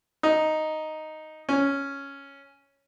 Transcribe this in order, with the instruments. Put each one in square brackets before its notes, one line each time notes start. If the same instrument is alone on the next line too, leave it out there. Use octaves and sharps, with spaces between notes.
[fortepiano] D#4
C#4